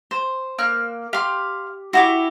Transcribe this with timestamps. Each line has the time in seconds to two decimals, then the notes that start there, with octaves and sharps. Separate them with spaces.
0.11 C5
0.58 A#3 F6 F#6
1.13 G4 F5 C6
1.93 E4 F#4 G4 D6